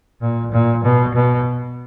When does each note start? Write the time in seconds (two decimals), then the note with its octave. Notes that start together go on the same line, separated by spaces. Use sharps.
0.21 A#2
0.52 A#2
0.84 B2
1.15 B2